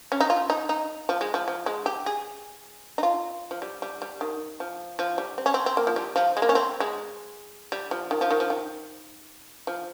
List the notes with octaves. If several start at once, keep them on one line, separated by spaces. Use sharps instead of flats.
C#4
D#4
F4
D#4
D#4
F3
G#3
F3
F3
G#3
G4
G#4
D#4
F4
F3
G3
G3
G3
D#3
F3
F3
G3
C4
C#4
C4
C4
A#3
F3
G3
F3
G#3
A#3
C#4
C4
G#3
G3
F3
D#3
F3
D#3
F3
D#3
F3